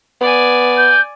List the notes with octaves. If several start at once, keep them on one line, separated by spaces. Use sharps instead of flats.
B3 D5 G#5
G6